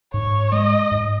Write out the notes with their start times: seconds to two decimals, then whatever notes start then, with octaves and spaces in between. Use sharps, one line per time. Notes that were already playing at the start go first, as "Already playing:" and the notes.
0.13 G#2 C#5
0.52 G#3 D#5
0.91 G#2